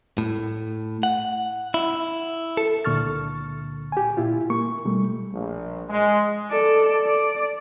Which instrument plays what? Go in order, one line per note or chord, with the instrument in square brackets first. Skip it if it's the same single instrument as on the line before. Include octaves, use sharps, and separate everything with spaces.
[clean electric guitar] A2
F#5
E4
A4
[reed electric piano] C#2 A#2 D3 C#6 F6 A6
G4 G#5
A#2 E4 F4
A#3 C#6
B2 G3 A3
[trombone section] A#1
G#3
[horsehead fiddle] A4 D5
D5